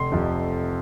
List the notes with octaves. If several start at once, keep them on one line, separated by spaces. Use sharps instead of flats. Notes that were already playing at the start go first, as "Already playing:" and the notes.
Already playing: F1 C6
F2 C3 F3